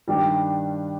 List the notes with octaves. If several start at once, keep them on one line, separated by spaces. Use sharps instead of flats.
G2 D#3 G3 D4 G4